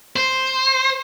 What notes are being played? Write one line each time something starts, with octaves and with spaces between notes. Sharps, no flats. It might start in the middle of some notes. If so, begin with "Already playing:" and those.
C5